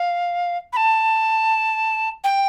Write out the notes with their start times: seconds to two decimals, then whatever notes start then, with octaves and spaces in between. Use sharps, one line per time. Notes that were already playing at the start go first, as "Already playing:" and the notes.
Already playing: F5
0.73 B5
0.77 A5
2.24 G5